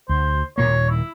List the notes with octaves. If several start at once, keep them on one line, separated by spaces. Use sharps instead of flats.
D2 C5
D#1 A#2 A#3 C#5
E4